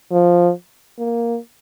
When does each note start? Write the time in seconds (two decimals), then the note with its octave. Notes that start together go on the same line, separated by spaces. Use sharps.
0.12 F3
0.99 A#3